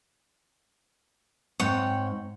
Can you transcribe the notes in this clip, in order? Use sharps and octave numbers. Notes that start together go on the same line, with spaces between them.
G#2 C4 C#5 F#5 G5